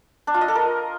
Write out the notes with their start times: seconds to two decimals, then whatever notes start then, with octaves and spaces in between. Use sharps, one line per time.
0.27 D4
0.34 F4
0.41 D#5
0.48 A4
0.55 A#4